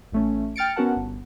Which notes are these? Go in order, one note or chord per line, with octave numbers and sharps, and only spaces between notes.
A1 A3 C#4
G5 F6 A6 C#7 D7
B3 C#4 F#4 A#4 F#5 A5
G1